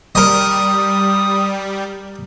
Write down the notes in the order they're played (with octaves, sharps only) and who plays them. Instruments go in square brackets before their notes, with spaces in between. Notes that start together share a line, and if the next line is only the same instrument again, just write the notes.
[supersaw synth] G3 [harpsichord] A#4 D#5 [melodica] D#6